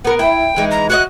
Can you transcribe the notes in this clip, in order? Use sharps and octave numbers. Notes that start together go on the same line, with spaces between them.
B3 A#4 F#5
E4 G5
E3 G#3 D#4
A#5
F#4 C#5 D#5 F#6